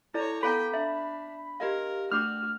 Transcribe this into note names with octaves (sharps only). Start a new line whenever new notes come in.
E4 A4 C#5 D5 A#5
B3 A4 F5 G5 A#5 B5
D4 E5
G4 A#4 D#5 F5
A3 D4 F#4 D6 F6